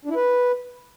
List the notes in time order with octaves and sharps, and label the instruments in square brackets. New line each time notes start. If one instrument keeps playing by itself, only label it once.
[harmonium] D4
E4
B4